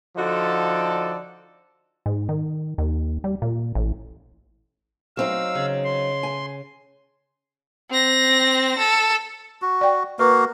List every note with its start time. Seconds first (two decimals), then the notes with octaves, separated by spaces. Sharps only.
0.17 D3 F3 D#4 F#4 A4 D5
2.06 G#2
2.29 D#3
2.78 D#2
3.24 G3
3.42 A#2
3.75 A1
5.17 F#3 C4 D#4 F5 E6
5.55 C#3
5.84 C6
6.23 G#5
7.90 C4 A#6
8.78 A4
9.62 F#4
9.81 D5 G5
10.19 A#3 F#4 B4 F5